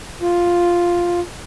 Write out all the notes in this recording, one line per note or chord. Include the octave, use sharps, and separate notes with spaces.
F4